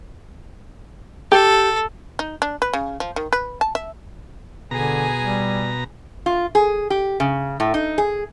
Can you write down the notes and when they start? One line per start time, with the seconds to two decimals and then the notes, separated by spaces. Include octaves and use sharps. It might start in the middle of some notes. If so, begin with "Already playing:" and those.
1.32 G4 A4
2.19 D#4
2.42 D4
2.62 B4
2.73 C#3
3.00 F3
3.16 D#3
3.33 B4
3.61 A5
3.75 E5
4.71 B2 D3 G#4 G#5 A#5
5.20 G3
6.26 F4
6.55 G#4
6.90 G4
7.20 C#3
7.60 A2
7.74 D#4
7.98 G#4